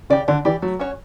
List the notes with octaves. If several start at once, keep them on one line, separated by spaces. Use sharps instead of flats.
C#3 G4 D5
D3 D4
E3 G4 D5
F#3 A3
C#4 F#4 C#5